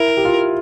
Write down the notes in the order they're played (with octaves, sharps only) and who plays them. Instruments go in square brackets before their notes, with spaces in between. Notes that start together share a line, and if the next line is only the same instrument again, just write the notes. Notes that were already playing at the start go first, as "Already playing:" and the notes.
Already playing: [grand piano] E4 [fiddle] A#4
[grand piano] G4
F4